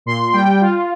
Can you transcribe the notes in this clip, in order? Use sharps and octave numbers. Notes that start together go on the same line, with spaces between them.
A#2 C6
G3 G5
F4